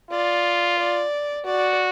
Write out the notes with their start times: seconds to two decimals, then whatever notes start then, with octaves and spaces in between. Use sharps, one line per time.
0.11 F4 D5
0.78 D5
1.45 F#4 D5